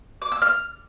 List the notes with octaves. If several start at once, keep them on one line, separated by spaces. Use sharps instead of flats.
D6
E6
F6